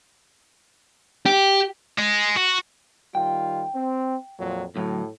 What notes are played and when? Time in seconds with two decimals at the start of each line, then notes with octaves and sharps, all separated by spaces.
1.26 G4
1.99 G#3
2.37 F#4
3.15 D#3 G3 F4 G5
3.75 C4
4.39 F2 A#2 F#3
4.76 D2 A2 F#3